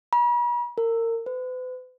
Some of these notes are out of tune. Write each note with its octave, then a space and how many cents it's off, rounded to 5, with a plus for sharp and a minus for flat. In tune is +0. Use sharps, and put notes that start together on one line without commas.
B5 -45
A#4 -30
B4 +45